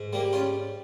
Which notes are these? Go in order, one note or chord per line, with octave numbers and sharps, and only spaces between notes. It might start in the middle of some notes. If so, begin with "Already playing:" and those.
Already playing: G#2
G3 A#3
C#4 F4